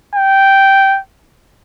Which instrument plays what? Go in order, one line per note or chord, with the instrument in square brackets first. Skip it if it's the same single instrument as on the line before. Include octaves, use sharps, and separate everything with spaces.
[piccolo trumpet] G5